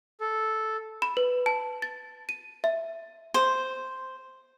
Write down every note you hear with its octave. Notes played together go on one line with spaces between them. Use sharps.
A4
B5
B4
A5
A6
D#7
E5
C5